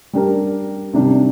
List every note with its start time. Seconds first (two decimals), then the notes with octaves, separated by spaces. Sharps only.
0.13 G3 D4 G4 A#4
0.93 C3 D#3 G3 D4